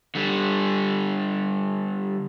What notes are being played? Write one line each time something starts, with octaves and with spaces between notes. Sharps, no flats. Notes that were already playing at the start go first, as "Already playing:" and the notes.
D3 G3